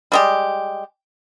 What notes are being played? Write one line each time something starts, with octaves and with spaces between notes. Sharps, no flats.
G3 G#3 G4